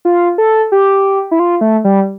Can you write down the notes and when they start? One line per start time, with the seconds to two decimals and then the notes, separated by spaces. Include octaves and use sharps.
0.05 F4
0.38 A4
0.72 G4
1.31 E4
1.39 F4
1.61 A3
1.84 G3